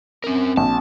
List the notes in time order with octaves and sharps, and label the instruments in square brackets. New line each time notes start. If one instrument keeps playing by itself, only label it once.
[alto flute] C4 [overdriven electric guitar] C#4 A#4
[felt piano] A#1 [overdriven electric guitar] A5